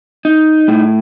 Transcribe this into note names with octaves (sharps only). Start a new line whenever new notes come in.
D#4
A2